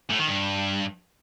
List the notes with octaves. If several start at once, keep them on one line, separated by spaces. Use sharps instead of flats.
A2
D#3
G2